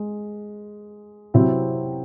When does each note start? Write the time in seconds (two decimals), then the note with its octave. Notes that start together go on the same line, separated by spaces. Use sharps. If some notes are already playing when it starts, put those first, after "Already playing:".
Already playing: G#3
1.34 C3 F#3 C4 E4